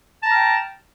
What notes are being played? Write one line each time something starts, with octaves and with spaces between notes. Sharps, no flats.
G5 A5 A#5 F6